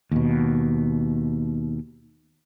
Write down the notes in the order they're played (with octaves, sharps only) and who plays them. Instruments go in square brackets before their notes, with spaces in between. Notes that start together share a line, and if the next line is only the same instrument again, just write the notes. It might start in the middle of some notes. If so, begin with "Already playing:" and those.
[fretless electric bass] D#2 B2